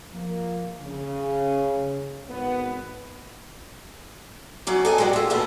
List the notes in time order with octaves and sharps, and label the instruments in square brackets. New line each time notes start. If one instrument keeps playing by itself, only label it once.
[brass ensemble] F3 A#3
C#3
G#1 B3
[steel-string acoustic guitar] F#3 C#4 D5
A4 D#5 F5 G#5
G#3 F#4 G4 A#4 D5 F#5
F4 E5
D#2 B2 A3 B3 A4